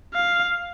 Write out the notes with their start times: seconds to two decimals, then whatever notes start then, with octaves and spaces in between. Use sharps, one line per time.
0.14 F5